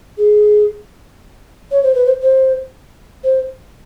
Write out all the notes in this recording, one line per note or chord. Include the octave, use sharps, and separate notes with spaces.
G#4
C#5
C5
B4
C5
C5
C5